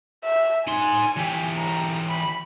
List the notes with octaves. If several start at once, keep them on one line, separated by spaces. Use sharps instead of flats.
E5
D#4 G#5 C6
E3 G4
A#5
B5